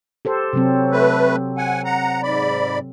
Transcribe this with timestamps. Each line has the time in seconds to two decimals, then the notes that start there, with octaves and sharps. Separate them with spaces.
0.25 G4 A4 C5
0.53 C3 F#3 C4
0.92 A3 B4
1.58 F#5 G#5
1.85 F#5 A#5
2.23 G#2 D5 B5